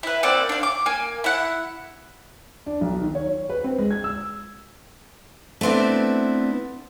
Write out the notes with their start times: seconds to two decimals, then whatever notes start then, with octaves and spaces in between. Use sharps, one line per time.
0.03 E4 B4
0.23 A#3 C4 D5 F#5
0.49 D4 F5
0.63 D6
0.86 A#3 G#5
1.24 E4 F#5
2.66 D4
2.81 B1
3.01 D#3
3.15 C#5
3.49 B4
3.64 C4
3.79 G#3
3.91 G#6
4.04 E6
5.61 A3 B3 C4 D4 E4